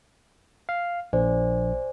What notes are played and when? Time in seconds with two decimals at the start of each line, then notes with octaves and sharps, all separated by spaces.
0.69 F5
1.13 A#1 C5 D5 G#5